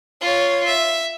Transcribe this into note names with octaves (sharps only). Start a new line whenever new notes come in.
F4 C#5
E5